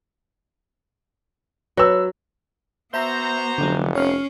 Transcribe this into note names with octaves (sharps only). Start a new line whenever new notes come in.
F#3 B4 E6
B3 F#4 C5 E5 A#5 E6
F1 D3 F#3
C#4 C#5 F6 C7